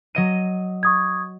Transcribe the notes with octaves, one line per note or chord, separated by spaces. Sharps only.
F#3 D#5 D#7
C#6 D#6 G#6